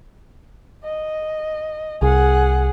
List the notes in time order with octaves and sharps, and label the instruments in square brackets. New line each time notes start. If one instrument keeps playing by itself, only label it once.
[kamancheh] D#5
[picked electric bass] C2 [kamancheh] G#4 F#5